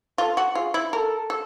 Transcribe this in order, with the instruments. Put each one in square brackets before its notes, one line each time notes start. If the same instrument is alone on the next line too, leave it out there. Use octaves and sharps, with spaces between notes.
[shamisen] F4 [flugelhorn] A4
[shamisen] F#4
[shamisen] F4 [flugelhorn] G#4
[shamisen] E4
[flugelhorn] A4 [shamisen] A#4
[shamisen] A4